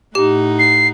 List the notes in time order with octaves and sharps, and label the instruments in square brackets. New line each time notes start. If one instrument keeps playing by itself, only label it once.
[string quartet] A2 D#4 F#5 [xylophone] G4
[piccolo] C7